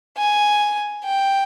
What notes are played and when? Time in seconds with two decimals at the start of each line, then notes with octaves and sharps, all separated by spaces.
0.18 G#5
1.04 G5